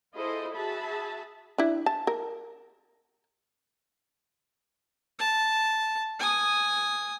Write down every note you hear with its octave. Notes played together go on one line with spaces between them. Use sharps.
E4 F4 G#4 A4 C5 D#5
F#4 G#4 E5 A5 B5
D4 E4
A5
A#4
A5
G#5 D#6